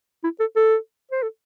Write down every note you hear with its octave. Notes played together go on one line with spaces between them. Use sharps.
E4
A4
A4
C5
A4